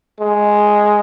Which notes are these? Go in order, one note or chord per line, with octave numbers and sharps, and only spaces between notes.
G#3